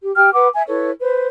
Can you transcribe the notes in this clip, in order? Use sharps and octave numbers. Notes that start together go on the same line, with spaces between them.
G4
G4 G5 F6
B4 F#5 D6
E5 G#5
E4 A4 B4 C#5
B4 C5